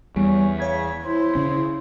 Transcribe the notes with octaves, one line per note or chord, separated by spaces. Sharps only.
E2 G3 C#4
C#3 C#5 G#6 B6
E4 C5
C#3 C#4